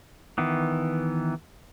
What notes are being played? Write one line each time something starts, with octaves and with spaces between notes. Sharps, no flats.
D#3 E3 B3